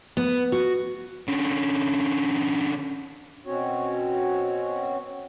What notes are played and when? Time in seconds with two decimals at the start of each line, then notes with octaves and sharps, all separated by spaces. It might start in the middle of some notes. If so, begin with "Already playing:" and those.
0.17 B3
0.52 F#4
1.28 D3 C#4
3.46 B2 C4 C#4 F#4 C#5